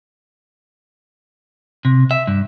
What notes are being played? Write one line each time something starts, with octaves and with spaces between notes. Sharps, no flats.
C3
E5
G2